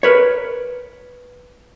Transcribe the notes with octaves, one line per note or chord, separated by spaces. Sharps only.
A#4 B4 C#5